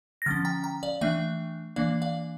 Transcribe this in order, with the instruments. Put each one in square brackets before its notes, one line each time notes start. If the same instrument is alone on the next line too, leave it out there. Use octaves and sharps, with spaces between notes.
[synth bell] A#6
D3 F3 C#4 F6 A6
G5 A#5
G5 A#5
D5 F5
E3 A3 D4 E5 G5
E3 A#3 D4 D5 F5
D5 F5